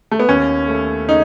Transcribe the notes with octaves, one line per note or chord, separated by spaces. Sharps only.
A3
B3
D#2 C#4
A3
C#3 D#4